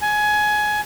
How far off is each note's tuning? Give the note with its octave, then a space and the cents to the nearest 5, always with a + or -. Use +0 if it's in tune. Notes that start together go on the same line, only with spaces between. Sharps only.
G#5 +20